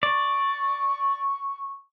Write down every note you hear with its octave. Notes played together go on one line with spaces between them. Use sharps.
D5 C#6